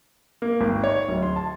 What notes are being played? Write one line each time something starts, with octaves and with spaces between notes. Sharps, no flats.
A#3
G#1
C#5
D1
C6
A5